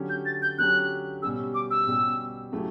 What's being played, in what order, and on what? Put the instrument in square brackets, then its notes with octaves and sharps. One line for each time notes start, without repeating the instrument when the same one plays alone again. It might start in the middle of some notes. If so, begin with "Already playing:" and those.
Already playing: [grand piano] D3 F#3 C#4 G4
[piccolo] G6
A6
G6
[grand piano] D3 F#3 C#4 G4 [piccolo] F#6
[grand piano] B2 G3 C#4 G4 [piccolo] E6
[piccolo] D6
E6
[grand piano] B2 G3 C#4 G4
C#3 F#3 A3 E4 G4